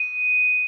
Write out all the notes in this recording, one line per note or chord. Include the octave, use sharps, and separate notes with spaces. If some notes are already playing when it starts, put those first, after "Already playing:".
Already playing: D#7